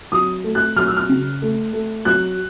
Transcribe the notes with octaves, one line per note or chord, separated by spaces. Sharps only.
F#3 D#6
A3
F#6
F#3 F6
E6
F6
C#3
A3
A3
F#3 F#6